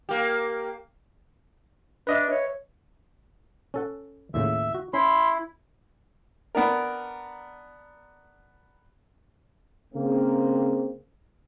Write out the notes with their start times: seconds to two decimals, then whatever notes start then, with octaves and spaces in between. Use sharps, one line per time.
0.09 A#3 G4
2.07 D4 B4 D#5 E5
2.30 C#5
3.74 C#4 A4 F#5
4.34 D#2 A2 C#3 E5
4.75 F#4
4.94 C#4 E4 B5 C6
6.55 B3 D4 A#4
9.94 C#3 A#3 C4